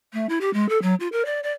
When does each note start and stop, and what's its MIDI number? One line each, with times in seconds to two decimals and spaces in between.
0.13 0.27 57
0.29 0.38 64
0.41 0.53 67
0.53 0.69 56
0.69 0.81 69
0.82 0.95 54
1.00 1.08 65
1.12 1.23 70
1.25 1.40 74
1.43 1.52 74